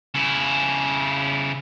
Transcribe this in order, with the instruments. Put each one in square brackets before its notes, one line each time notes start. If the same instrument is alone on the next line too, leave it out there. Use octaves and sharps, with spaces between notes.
[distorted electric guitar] C#3 E4